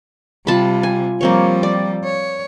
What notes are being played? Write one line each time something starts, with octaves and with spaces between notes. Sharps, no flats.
C3 G3 F4 A5 B5
G#5
F3 G3 A#3 C4 C#5
D5
C#5